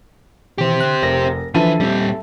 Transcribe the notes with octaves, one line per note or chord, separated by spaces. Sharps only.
B2 D#3 E3 G4 C5
D3 F#6
F1 A#4 A#6
D3 E3 F3 A4 B4 E5 A5 D#7
A#2 G3 C4